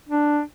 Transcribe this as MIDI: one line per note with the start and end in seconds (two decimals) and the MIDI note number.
0.09 0.40 62